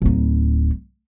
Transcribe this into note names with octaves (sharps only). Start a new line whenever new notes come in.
D1 D#4